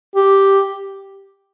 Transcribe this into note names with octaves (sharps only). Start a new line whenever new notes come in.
G4